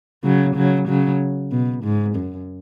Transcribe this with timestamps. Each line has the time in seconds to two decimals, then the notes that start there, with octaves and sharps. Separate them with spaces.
0.24 C#3 F#3
0.56 C#3 F#3
0.88 C#3 F#3
1.52 B2
1.84 G#2
2.15 F#2